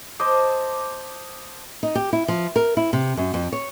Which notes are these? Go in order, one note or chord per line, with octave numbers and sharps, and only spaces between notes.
C5 D#5 A5 D6
D#4
G4
E4
F3
A#4
E4
C3
F#2
F2
C#5